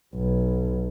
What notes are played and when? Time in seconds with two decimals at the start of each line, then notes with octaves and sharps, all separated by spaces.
0.14 B1